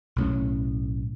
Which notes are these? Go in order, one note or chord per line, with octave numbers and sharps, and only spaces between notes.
B1 A2 C#4